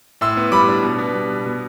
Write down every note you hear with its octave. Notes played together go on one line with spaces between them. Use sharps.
A2 C6 E6
B3
G3 B5 D6
D4
B2
B3
G3
B2
B2